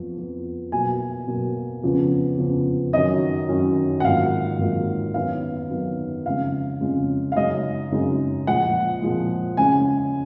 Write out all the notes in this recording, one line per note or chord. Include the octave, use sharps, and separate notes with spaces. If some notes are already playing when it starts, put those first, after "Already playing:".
Already playing: F2 F3 B3
F2 F3 B3
B2 F#3 A#3 G#5
B2 F#3 A#3
F2 C#3 F3 B3
F2 C#3 F3 B3
F#2 D#3 F#3 C#4 D#5
F#2 D#3 F#3 C#4
F#5
G#2 D#3 F#3 A#3 F4 F5
G#2 D#3 F#3 A#3 F4
F#2 D#3 F#3 B3 F5
F#2 D#3 F#3 B3
F2 C#3 G#3 F5
F2 C#3 G#3
F5
F#2 C#3 G#3 D#4 D#5
F#2 C#3 G#3 D#4
A#2 F3 G#3 F#5
A#2 F3 G#3
C#3 G#3 C#4 G#5